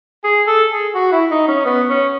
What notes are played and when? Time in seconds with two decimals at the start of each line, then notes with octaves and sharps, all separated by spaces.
0.24 G#4
0.47 A4
0.71 G#4
0.95 F#4
1.12 E4
1.31 D#4
1.48 C#4
1.66 B3
1.89 C#4